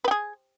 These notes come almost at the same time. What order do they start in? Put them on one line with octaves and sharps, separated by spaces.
B4 G4 G#4